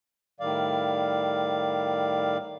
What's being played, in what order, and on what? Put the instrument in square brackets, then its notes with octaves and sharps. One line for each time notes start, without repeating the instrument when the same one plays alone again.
[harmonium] A2 D#3 G3 D5 F5